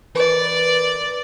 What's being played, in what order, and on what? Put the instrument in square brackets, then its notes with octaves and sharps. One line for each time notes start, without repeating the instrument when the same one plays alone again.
[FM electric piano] E3 A#4 B4 [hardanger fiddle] D5